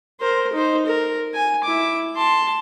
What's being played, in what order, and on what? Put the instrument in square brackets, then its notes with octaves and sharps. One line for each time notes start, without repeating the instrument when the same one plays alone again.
[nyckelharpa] A#4 C5
D#4 C5
A#4
G#5
E4 D6
A5 C6